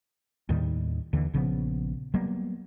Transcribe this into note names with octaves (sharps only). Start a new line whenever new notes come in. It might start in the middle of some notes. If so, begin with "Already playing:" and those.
D#2 A2 D#3 G3
D#2 D3 E3
A#1 C#3 F3 B3
F#3 G3 A#3 B3